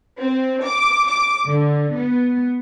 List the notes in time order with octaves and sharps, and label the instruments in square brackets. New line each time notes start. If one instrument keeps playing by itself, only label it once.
[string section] C4
D6
D6
D3
B3